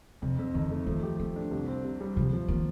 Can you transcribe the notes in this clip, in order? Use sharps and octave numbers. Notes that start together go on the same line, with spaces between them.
F2 C3
F2
D3 D#3
A3
D#3 F3
G4
D#3 A3
D4
C2
C4
C3
G3
C3 F3
F3
D#3 A#3